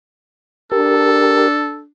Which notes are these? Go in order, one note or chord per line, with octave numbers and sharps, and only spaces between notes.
D4 G4 A4 A#4